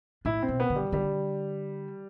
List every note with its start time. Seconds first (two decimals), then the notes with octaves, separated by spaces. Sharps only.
0.25 A2 E4
0.43 C4
0.48 B2
0.60 B3
0.70 D3
0.76 G3
0.92 D3 G3